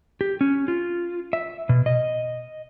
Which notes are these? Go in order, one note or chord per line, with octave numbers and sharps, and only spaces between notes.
G4
C#4
F4
E5
B2
D#5